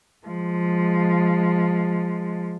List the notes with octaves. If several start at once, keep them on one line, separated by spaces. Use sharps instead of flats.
F3 G#3